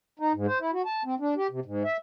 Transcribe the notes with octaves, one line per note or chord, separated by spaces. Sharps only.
D#4
G#2
C5
E4
F#4
A5
C4
D4
G4
C3
G#2
E5